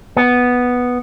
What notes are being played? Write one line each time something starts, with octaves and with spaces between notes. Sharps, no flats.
B3